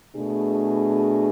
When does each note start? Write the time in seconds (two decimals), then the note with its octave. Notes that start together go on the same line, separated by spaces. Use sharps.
0.13 B2 A3 D4 G#4